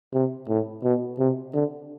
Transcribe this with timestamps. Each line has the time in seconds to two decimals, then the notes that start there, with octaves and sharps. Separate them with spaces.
0.14 C3
0.49 A2
0.84 B2
1.19 C3
1.54 D3